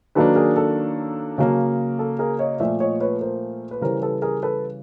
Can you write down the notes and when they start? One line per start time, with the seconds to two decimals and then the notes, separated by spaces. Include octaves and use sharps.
0.15 D#3 F#3 A#3 D4 A4 B4
0.36 G#4 A#4
0.57 A4
1.38 C#3 F#3 A#3
1.99 A4
2.19 G#4 A#4
2.39 C#5 D#5
2.60 A#2 F3 A3 D5 E5
2.80 C#5 D#5
3.01 B4 C#5
3.21 A#4 C5
3.71 B4
3.81 C#3 E3 G3 A#4 C5
4.02 A4 B4
4.22 G#4 A#4
4.43 A4 B4